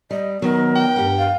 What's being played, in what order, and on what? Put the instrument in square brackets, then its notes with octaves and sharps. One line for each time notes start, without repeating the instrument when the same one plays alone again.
[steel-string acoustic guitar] G3 [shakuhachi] D#5
[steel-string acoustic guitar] D#3 F#3 [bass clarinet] B3 [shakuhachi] A#4
[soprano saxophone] G5
[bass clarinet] G2 [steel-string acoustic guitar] G4 F#5
[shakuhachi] F5